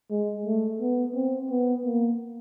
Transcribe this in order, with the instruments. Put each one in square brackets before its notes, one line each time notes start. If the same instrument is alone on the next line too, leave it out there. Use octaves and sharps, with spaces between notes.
[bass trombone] G#3
A3
B3
C4
B3
A#3